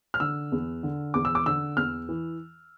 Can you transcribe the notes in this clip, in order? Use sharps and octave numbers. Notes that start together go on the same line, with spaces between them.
F6
D3 E6
E2
D3
E2 D6
E6
D6
D3 E6
E2 F6
E3